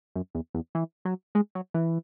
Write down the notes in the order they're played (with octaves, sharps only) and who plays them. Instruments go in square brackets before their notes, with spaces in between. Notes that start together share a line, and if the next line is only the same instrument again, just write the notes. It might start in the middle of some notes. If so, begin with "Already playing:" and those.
[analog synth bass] F#2
E2
E2
E3
F#3
G#3
F#3
E3